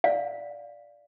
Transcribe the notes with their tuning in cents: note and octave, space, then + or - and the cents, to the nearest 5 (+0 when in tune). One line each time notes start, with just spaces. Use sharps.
D5 -5 F5 +0